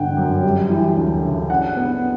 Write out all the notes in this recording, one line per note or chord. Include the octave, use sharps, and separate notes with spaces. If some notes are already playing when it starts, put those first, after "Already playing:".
Already playing: G1 D3 F#5 G5
F#2
G3
E3
D2
C#3
D4 F#5
B3